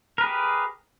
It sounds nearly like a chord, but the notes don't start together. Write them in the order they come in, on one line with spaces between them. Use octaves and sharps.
A#4 B4 G#4 G4